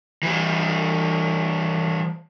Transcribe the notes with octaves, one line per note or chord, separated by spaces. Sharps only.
E3 G3